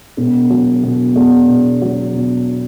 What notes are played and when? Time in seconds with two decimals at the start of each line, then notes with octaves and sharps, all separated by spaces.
0.17 E1
0.50 F#3
0.83 B2
1.16 E2
1.48 E1
1.82 F#3
2.14 B2